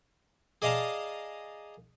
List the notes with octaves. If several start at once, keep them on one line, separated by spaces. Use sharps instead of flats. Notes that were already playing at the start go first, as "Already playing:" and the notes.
G#4 D5 D#5 F5 A5 A#5